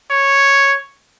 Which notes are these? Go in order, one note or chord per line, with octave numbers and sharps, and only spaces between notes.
C#5